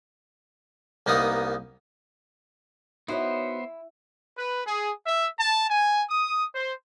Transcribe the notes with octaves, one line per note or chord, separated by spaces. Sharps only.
C2 A#3 B3 D#4 D#6
B3 D#4 E4 F#4 C5 C#5
B4
G#4
E5
A5
G#5
D#6
C5